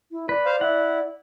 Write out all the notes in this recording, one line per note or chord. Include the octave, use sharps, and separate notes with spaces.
E4
B4 D5
C5 F5
E4 F#5